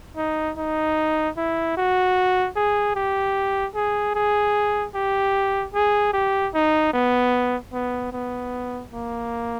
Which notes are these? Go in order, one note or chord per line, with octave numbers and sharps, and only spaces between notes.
D#4
D#4
E4
F#4
G#4
G4
G#4
G#4
G4
G#4
G4
D#4
B3
B3
B3
A#3